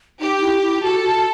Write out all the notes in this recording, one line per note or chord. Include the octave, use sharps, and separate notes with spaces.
D#4 G4
E4
E4
F#4 A4
F#4
F#4